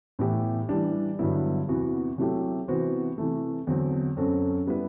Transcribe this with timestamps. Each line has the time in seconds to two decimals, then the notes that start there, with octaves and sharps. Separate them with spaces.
0.19 A2 E3 B3 E4 G4
0.69 E3 G3 D4
1.19 G2 D3 F#3 B3 E4
1.69 E2 C3 E3 B3 F#4
2.18 C3 F#3 A3 E4 G4
2.68 C3 E3 B3 F#4 C5
3.18 C3 E3 A3
3.67 E2 D3 F#3 C4
4.17 F#2 F#3 C4 F#4 A4
4.67 G3 B3 E4 B4